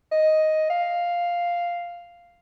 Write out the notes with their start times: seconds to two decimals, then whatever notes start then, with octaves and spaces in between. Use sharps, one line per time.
0.12 D#5
0.70 F5